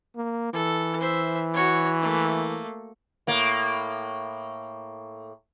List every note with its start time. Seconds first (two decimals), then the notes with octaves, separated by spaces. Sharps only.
0.16 A#3
0.53 E3 A4
1.00 C5 E5
1.54 F#4 C#5
2.02 A3 A#3
3.27 A2 A#3